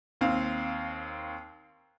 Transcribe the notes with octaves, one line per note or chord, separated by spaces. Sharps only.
D#2 C4 F5